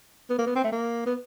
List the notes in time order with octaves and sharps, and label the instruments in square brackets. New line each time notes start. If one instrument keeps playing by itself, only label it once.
[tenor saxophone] B3
A#3
B3
C4
A3
A#3
B3